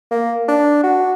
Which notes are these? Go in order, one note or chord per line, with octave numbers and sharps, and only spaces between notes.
A#3
D4
F#4